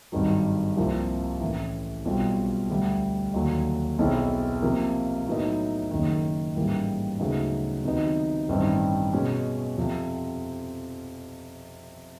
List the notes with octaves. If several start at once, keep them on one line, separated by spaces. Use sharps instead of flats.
G#1 G2 D#3 F#3
C2 C3 F3 A#3
A1 A2 E3
B1 B2 G3 C4 F4
D2 D3 G3
D#2 D3 F#3
B1 B2 G#3 C4 E4
C3 F3 A#3
A2 F#3 B3 D#4
F#1 F#2 D#3
A1 G#2 E3 G3 A#3
D2 C#3 F#3 B3 D#4
C3 D#3 F#3 B3 D#4
A1 G2 D#3 G3 C4
B2 G#3 C#4
F2 C3 F3